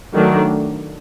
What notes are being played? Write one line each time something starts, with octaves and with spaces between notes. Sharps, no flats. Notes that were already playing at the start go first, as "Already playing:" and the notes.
D#3 F#3 A3 D4